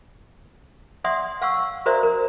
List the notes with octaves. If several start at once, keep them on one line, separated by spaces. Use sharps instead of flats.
D5 E5 F#5 C6 D#6
F5 F#5 C#6 E6
F#4 A#4 C5 D5 E5 A#5
A#4